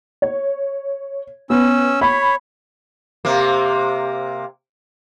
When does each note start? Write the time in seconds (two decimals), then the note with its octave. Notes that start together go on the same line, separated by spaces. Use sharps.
0.22 C#5
1.50 B3 C#4 E6
2.01 C#5 B5
3.25 C3 A#3